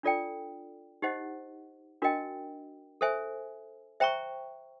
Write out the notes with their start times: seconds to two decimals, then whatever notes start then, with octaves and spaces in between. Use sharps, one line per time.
0.03 D4 F4 A4 D5 G5
1.02 D#4 G4 C5 D#5 F#5
2.02 D4 F#4 A#4 D#5 G5
3.01 A4 C5 E5 G#5
4.00 C5 E5 G5 A#5 C#6